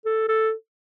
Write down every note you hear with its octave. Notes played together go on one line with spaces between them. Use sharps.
A4
A4